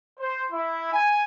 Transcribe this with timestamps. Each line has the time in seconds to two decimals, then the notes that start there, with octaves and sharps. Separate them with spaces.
0.19 C5
0.51 E4
0.93 G#5